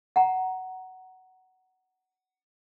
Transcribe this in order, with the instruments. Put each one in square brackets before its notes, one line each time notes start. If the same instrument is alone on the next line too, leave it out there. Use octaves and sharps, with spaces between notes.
[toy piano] F#5 A#5